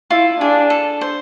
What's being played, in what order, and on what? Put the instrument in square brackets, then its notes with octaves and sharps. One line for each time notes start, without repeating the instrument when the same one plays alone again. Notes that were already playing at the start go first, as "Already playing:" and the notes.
[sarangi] E4 [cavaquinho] F4
[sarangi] D4 [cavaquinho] G#4
[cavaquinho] A4
C5